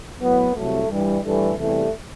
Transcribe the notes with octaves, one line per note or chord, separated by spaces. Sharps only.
A2 F#3 B3
C2 C3 F#3 A3
G2 E3 G3
G2 E3 G3 A3
E2 C3 E3 G3 A3